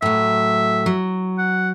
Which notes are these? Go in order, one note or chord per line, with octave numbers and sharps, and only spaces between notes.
A2 F#3 E5
F#3
F#5